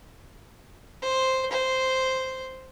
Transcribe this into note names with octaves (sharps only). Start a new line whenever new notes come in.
C5
C5